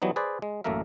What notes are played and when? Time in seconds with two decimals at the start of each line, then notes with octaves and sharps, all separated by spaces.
0.02 E3 F#3 G3 B3 D#4
0.16 G#4 B4 C5 D5
0.42 G#3
0.64 A1 F#2 A3 A#3 A#4 E5